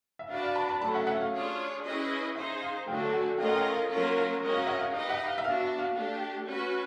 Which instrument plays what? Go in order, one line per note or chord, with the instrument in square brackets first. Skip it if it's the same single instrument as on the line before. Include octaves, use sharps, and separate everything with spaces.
[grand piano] E5
[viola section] D4 F#4 B4 D5 [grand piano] F5
[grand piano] F5
A5 B5
A5 B5
[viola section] F#3 A3 C#4 [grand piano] A5 B5
[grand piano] E5 F#5
E5 F#5
F5
[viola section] D4 F4 G#4 C#5
C#4 E4 G#4 B4 D#5
[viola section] D#4 G#4 C5 [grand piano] E5
[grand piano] F5
[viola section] D3 F#3 A3 D4 F#4 [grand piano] F5 G5
[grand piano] F#5 G#5
[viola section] A3 C#4 F4 A#4 D#5 [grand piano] F5 G5
[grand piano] F#5
F5 G5
F5
[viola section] F#3 A#3 C#4 F4 A#4 [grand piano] F5
[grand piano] F5
[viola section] G#3 C#4 F#4 A#4 D#5
[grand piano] F5
E5 F#5
F5
[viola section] D#4 G4 B4 D#5 [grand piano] F5
[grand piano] E5 F#5
F5
E5
[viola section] B3 D4 F#4 [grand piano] F5
[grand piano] E5
F5
[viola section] A3 D4 G4
C#4 F#4 B4